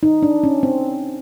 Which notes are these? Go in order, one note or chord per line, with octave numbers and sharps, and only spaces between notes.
D#4
D4
C#4
C4